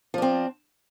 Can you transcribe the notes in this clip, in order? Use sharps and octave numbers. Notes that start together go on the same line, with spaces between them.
F3 C4 D4